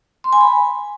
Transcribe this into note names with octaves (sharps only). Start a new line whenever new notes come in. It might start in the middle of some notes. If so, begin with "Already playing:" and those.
C6
G#5
B5